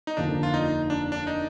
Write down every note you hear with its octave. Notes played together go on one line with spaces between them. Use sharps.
D#4
F1 D#2 D3 F3 D4
F4
D#4
D4
D4
D#4